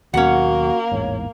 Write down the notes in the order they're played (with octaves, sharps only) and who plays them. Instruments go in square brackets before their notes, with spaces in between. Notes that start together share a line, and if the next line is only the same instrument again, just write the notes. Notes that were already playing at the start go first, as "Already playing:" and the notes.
[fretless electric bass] D#2 B2 F#3 [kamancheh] A#3 [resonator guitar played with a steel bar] C#4 F#5 [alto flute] F#4
[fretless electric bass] A1 E2 G#2 [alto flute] C#5